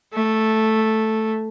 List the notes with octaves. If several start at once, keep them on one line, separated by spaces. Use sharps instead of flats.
A3